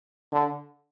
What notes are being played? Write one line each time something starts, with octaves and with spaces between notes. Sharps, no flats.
D3